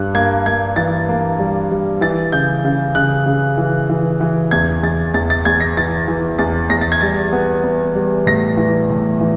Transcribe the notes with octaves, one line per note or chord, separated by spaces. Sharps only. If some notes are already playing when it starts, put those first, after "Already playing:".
Already playing: G2 G3 F#6
A#3 G#6
A#3 G#6
E3 A6
A#3
G3
G3
E3 A6
C#3 G6
C#3
C#3 F#6
C#3
E3
E3
E3
E2 G#6
E2 A6
E2 A6
A6
E2 G#6
A#6
E3 A6
E3
E2 A6
E2 A#6
A6
G#6
G3 A6
B3
B3
G3
A2 A#6
E3
A2
E3